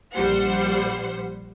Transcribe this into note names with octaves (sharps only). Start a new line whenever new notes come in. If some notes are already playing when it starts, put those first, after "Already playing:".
A#1 G3 C5 F#5